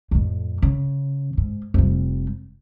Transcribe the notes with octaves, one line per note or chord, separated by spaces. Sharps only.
F2 A2
C#3
G#2
F1 G3